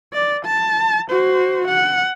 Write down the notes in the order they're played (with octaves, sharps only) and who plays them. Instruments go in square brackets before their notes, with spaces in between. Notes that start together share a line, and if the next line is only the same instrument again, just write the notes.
[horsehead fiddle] D5
A5
F#4 C5
F#5